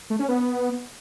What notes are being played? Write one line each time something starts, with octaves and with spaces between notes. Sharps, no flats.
A3
C#4
B3